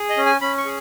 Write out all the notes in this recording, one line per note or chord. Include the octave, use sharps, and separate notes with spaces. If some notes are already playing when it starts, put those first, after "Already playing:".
Already playing: G#4
D#5
C#4
G#5
C#4 B5
C#6
G#4